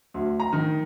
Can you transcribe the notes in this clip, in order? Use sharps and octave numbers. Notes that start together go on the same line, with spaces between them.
D2
A#5
D#3